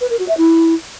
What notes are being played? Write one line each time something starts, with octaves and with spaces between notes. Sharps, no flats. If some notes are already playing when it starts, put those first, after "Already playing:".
B4
A#4
F#4
E5
E4